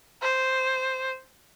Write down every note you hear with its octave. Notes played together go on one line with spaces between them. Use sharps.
C5